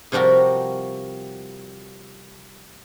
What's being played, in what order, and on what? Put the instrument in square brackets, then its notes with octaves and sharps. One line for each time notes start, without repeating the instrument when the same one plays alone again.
[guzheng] C3 F3 G3 F#4 A#4